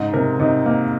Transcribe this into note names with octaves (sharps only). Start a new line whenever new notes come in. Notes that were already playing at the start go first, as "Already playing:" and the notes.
Already playing: G#2 C#3 D#4
C3 A#4
C3 D#4
A#3